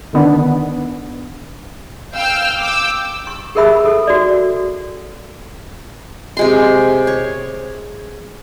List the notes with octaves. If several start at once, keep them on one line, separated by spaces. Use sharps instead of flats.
D3 D#3 B3 D4
F5 G5 E6 F6 G6
D6 E6 G6
C#6
G4 G#4 A#4 E5 B5 E6
A4
F#4 D5
C3 G#3 C6
C#5